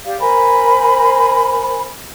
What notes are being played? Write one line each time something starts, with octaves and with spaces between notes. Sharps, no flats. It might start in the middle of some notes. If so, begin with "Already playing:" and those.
G4 D5 F5
A#4 C5 G#5 B5